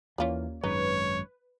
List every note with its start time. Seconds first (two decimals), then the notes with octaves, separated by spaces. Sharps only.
0.18 D#2 E3 A#3 C#4 F4 D5
0.64 G#1 F#2 G#3 D#4 B4 C#5